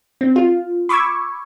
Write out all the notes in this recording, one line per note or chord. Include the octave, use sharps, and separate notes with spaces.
C4
F4
B5 C#6 D6 E6 G#6